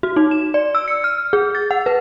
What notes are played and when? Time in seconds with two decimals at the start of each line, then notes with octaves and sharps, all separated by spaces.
0.03 F#4
0.16 D#4
0.31 E7
0.54 D5
0.75 E6
0.88 C#7
1.04 F6
1.33 G#4
1.55 A6
1.71 F#5
1.86 B4